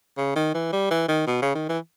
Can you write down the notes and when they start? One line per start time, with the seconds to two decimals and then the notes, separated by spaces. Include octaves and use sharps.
0.17 C#3
0.36 D#3
0.54 E3
0.72 G3
0.91 E3
1.08 D#3
1.27 B2
1.42 C#3
1.55 D#3
1.69 E3